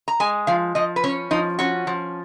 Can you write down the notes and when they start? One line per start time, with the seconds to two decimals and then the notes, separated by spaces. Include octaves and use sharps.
0.08 A#5
0.20 G#3 G#5
0.47 F3 F5
0.75 F3 D#5
0.96 B4
1.04 C#4 C#5
1.31 F3 D#4
1.59 C#4 F#4
1.87 F3